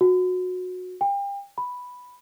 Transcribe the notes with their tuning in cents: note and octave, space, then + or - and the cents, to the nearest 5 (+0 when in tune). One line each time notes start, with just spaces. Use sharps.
F#4 -20
G5 +35
B5 +0